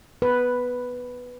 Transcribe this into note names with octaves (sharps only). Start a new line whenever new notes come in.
B4